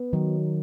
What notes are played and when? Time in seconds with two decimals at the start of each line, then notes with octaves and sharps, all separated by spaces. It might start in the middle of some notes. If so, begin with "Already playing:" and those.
Already playing: B3
0.13 D#3 F#3